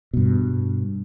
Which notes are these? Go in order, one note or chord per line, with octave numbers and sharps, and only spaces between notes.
G2 B2